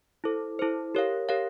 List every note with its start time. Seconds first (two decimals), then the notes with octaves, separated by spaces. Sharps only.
0.24 E4 A4 C5
0.59 E4 A4 C5
0.95 G4 A#4 C#5 F5
1.29 G4 A#4 C#5 F5